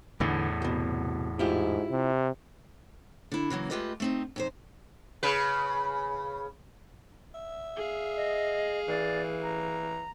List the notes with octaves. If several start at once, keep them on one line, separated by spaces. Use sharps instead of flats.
E2 A2 D3 E3
C2 B2
G#2 E4 F4 G4
C3
D3 E4
C#3 E3 F#3 A#3
G#3 A3 F4 G4 B4 D#5
A3 C4 D#4
F2 D#4 C5
C#3 B4
E5
G#4 F5
D#5
E3 D5
A#5